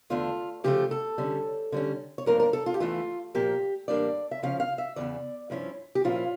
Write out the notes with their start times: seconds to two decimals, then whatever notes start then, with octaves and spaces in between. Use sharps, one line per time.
0.10 E2 D3 A3 D4 F4
0.64 C#3 F3 A3 G4
0.91 A4
1.18 D3 G3 C#4
1.72 D3 G3 C#4
2.18 C#5
2.26 G2 F3 A#3 D4 A#4
2.40 A#4
2.53 A4
2.66 F4
2.74 G4
2.80 E2 E3 A3 E4 F4
3.34 A#2 F3 A#3 G4
3.88 A2 E3 G3 A#3 D4 D5
4.31 E5
4.43 C#3 F3 C#4 F5
4.60 F5
4.78 E5
4.96 E2 C#3 E3 D5
5.50 G2 F3 C#4 E4
5.95 G4
6.04 A#2 F3 C#4 E4 F4